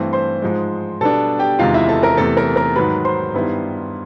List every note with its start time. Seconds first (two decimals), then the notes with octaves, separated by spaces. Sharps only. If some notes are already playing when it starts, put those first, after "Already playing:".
Already playing: G2 E3 A3 C4 C5 C6
0.13 C5 C6
0.42 G#2 F3 G#3
1.01 B2 G3 B3 D4 A4 A5
1.39 G4 G5
1.59 E2 C3 D#3 G#3 F4 F5
1.74 E4 E5
1.89 A4 A5
2.03 A#4 A#5
2.17 E2 C3 E3 A3 A4 A5
2.37 A#4 A#5
2.56 A#4 A#5
2.75 G#2 D#3 F#3 B4 B5
3.05 C5 C6
3.34 G2 D#3 G3 B3 E4